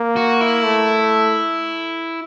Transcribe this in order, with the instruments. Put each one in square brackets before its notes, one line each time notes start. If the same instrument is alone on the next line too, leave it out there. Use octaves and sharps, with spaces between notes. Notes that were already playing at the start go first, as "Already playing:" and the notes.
Already playing: [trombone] A#3
[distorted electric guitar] F#4
E4
[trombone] A3